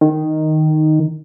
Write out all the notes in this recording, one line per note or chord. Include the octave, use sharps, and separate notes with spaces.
D#3